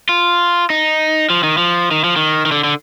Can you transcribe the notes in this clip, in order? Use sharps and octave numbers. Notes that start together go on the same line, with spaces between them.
F4
D#4
F3
D#3
F3
D#3
F3
D#3
D#3
D3
D3